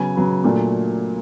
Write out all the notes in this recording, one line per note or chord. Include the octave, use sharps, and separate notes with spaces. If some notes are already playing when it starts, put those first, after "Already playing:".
Already playing: C#3 F#3 B3 G#5
C#3 F#3 B3
A#2 F#3 A3 D4